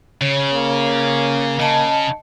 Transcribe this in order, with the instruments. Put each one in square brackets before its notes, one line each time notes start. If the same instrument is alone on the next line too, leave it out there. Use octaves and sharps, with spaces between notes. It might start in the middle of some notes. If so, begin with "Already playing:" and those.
[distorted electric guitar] C#3 [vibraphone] C#5
[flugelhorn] A#3
[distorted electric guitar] C#3 [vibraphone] D#5 A5